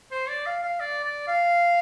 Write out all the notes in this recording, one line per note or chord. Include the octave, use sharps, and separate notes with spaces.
C5
D5
F5
F5
D5
D5
F5